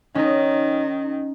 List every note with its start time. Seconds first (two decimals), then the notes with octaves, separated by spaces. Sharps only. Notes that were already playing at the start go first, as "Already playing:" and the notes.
0.15 D#3 C#4 D#4